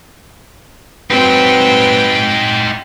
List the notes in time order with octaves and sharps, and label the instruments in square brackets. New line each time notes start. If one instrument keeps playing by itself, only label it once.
[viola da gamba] F#3 C4 [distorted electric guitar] D#4 C5 [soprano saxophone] B4 [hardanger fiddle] G5